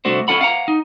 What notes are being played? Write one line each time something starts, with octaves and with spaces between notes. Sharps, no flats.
C2 A3 D4 F#4 C5
C#4 E4 F4 A4 F#5 B5
F5 F#5 A#5
D#4